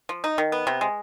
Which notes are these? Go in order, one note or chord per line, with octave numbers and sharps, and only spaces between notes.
F3
D#4
D#3
B3
C3
G#3